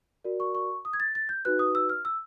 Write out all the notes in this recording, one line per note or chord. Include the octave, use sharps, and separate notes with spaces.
F#4 A#4 D5
C#6
C#6
D#6
G#6
A6
A6
G6
D#4 F#4 B4 F#6
D#6
E6
F6
E6